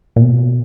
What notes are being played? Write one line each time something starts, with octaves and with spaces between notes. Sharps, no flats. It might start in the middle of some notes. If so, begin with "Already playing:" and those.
A#2
B2